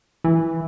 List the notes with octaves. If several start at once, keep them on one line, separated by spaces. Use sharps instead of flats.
E3